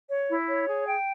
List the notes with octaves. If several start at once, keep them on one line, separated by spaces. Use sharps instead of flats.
C#5
E4
C#5
G#4
G5